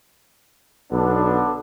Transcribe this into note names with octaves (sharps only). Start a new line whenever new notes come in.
B1 D3 B3 D4